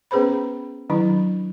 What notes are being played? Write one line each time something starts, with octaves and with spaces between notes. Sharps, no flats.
B3 C#4 G#4 B4 C5 B5
D#3 F#3 D4 E4